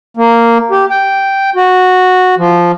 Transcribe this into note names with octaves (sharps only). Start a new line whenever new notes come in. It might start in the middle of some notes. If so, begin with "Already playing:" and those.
A#3
G4
G5
F#4
F3